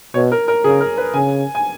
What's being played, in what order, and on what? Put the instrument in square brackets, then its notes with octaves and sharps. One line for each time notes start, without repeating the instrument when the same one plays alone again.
[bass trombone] B2 [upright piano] C#5
[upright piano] A#4
A#4
[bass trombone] C#3 [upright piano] G#4
[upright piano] A#4
B4
[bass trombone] C#3 [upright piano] G#5
[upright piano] G#5